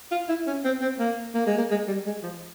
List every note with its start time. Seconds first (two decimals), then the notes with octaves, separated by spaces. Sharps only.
0.11 F4
0.29 E4
0.47 C#4
0.65 C4
0.81 C4
0.99 A#3
1.35 A#3
1.46 G#3
1.58 A#3
1.71 G#3
1.88 G3
2.06 G#3
2.23 F3